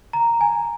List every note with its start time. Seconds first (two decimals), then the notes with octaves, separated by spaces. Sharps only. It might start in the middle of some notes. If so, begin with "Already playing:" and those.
0.13 A#5
0.41 G#5